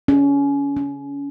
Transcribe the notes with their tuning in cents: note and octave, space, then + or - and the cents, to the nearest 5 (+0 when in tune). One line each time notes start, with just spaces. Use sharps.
C#4 +25
C#4 +35